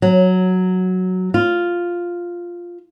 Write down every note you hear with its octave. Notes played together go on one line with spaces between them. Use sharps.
F#3
F4